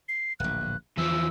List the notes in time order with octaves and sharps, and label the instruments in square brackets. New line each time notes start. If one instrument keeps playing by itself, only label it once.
[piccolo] C7
[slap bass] D1 A#1 [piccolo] F#6
[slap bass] E2 [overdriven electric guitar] E3 F3 [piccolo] E6